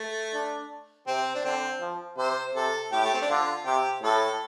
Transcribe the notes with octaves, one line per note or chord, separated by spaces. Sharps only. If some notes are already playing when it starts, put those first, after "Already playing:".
Already playing: A3
D4
C3 C4
D4
D3 C4
F3
C3 C5
C3 A4
A2 G4
A3
C4
D4
D3 F4
C3 G4
A2 A4